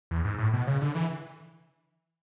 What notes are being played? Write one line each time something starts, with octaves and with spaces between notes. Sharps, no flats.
E2
G#2
A2
B2
C#3
D3
E3